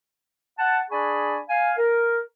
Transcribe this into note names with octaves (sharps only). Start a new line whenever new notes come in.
F#5 A5
D4 G#4 D5 G#5 B5 C#6
F5 G#5
A#4